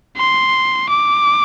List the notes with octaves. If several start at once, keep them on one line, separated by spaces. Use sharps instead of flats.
C6
D6